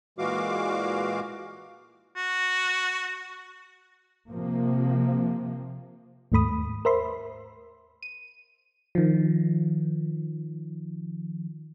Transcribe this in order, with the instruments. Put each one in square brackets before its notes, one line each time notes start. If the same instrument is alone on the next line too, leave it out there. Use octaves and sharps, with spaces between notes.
[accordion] A#2 E3 G#3 F#4 F5 D6
[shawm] F#4
[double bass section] C3 F3 A#3
[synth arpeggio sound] D#2 G#2 A3 B5 D#6
A#4 C5 E5 B5 C6
D#7
[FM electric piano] D#3 F3